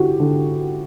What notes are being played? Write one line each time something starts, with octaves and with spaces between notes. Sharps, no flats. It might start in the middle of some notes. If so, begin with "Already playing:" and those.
Already playing: D3 E4 F#4 G4
D3